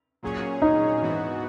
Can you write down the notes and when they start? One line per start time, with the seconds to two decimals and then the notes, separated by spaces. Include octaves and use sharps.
0.23 A#2 F#3 C#4 G#4 C#5
0.62 D#4
1.01 G#2 E3 B3 F#4